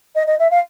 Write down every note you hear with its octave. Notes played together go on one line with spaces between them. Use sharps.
D#5
D#5
E5
F5